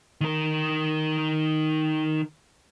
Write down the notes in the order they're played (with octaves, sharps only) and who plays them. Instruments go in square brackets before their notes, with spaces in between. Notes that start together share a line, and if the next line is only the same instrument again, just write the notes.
[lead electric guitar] D#3 A#4